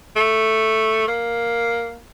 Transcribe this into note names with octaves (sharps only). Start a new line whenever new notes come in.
A3
A#3